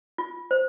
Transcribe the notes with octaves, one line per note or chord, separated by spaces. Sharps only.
F4
C5